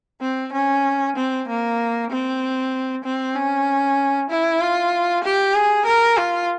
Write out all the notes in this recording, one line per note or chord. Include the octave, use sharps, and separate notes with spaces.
C4
C#4
C4
A#3
C4
C4
C#4
E4
F4
G4
G#4
A#4
F4